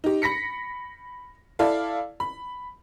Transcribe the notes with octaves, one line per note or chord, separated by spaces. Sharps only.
D#4 G4
B5 A#6 B6 C#7
E4 A4 D5 F5
B5